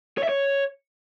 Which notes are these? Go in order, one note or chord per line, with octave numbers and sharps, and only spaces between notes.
C#5
E5
C#5